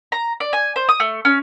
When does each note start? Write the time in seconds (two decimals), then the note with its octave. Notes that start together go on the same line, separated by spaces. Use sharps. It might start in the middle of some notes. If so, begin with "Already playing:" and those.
0.12 A#5
0.40 D5
0.53 G#5
0.76 C5
0.89 D#6
1.00 A3
1.25 C#4